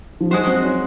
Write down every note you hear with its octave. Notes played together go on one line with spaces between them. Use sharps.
F3
F#3 G#3 D#4 F#4 C5
C4
C#4